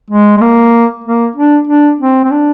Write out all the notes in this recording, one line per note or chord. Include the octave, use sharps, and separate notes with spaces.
G#3
G#3
A#3
A#3
D4
D4
C4
C4
D4